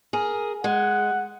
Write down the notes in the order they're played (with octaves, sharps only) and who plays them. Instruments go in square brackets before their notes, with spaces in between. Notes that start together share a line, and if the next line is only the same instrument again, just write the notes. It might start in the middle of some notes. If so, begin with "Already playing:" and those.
[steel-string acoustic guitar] G#4 A#4
[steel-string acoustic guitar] G#3 [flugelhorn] F#5